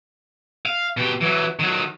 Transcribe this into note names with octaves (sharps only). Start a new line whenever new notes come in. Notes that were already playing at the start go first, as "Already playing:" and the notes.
F5
B2 G4
E3 F#3
D#3 F#3